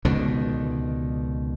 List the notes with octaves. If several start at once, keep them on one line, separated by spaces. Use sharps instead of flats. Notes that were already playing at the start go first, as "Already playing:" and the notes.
C#2 B2 D3 D#3